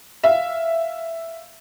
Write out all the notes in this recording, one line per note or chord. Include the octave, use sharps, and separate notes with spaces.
E5 F5